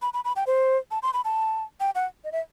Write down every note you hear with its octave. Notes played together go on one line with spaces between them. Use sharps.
B5
B5
B5
G5
C5
A5
C6
B5
A5
G5
F#5
D#5
E5